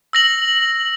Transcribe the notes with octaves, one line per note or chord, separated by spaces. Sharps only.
E6 A#6 F#7